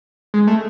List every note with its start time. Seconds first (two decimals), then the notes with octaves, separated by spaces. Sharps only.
0.34 G#3
0.47 A3